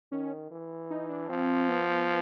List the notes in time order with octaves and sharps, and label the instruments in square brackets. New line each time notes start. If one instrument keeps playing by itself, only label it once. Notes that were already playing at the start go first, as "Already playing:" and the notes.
[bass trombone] D#3 [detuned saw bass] C#4
[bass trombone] E3
[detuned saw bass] D#4
D4
[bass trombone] F3 [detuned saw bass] C4
[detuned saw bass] B3